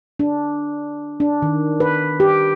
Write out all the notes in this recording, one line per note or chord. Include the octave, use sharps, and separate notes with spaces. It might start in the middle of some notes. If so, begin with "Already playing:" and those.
D4
D4
D#3
B4
G4